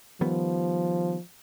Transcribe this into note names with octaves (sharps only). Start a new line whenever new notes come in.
D#3 F3 G3 B3